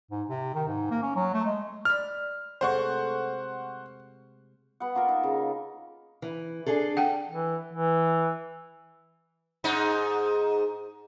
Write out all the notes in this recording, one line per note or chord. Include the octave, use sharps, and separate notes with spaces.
G#2
C3
D#3
G#2
A#3
C#4
F#3
A3
G#3
D5 B5 F6
C3 G#3 A3 C5 F#5 C#6
B3 F#5
A#3 F4 A4 A#4
D#4
C#3
E3
D4 G#4 A4
F#5 G5 A5
E3
E3
G#2 D#4